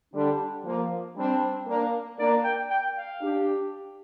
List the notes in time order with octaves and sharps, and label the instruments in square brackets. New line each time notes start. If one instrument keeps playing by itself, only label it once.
[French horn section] D3 G3 [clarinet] D4
[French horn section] F3 A#3
[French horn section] G3 C4 [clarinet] D4
[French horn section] A#3 D4
[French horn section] A#3 D4 [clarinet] D5
[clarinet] G5
G5
F5
[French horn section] D4 G4